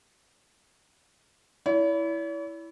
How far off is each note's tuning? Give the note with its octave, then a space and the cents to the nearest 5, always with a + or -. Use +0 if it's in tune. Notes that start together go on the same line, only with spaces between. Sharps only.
E4 +0 C#5 +45